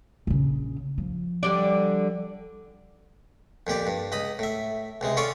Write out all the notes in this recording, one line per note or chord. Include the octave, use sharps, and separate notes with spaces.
A#1 C#3
F3
D3 G3 D5
F2 A#2 G4 D5
G2
C#2 D#5 B5
A2 E5
C#2 C3 G#3
C#4 F4 A4 C#5 D5 F5